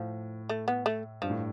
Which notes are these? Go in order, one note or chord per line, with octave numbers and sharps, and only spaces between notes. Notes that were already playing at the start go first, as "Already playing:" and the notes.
Already playing: A2 F3
A3
B3
A3
G2 F3
A2